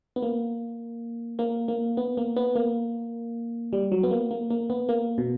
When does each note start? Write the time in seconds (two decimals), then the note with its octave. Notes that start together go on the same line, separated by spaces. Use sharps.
0.16 B3
0.22 A#3
1.39 A#3
1.68 A#3
1.97 B3
2.17 A#3
2.36 B3
2.56 A#3
3.73 G3
3.92 F#3
4.03 B3
4.11 A#3
4.31 A#3
4.50 A#3
4.70 B3
4.89 A#3
5.18 B2